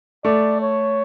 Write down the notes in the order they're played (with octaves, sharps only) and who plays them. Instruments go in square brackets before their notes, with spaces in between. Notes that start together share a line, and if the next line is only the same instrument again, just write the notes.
[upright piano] A3 [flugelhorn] D5
[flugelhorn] C#5